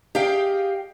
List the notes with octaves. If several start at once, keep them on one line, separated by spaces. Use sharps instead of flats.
G4 G#4 D#5 F5 G5